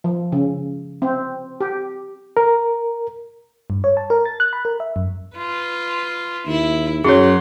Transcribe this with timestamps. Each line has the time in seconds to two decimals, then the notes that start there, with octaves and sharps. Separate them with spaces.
0.04 F3
0.32 C#3
1.02 C4
1.61 G4
2.37 A#4
3.70 G2
3.84 C#5
3.97 A5
4.10 A#4
4.25 A6
4.40 F#6
4.53 B5
4.65 A#4
4.80 E5
4.96 F#2
5.37 F4 B4
6.47 D#2 E4
7.04 F#2 F#3 G#4 C#5 C6